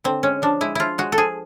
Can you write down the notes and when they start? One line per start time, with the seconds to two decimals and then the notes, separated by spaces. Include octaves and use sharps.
0.04 D3 C4
0.23 G#3 C#4
0.42 F3 D4
0.61 G#3 E4
0.75 F3 E4 F4
0.98 G#3 F#4
1.12 A4
1.17 F3 G#4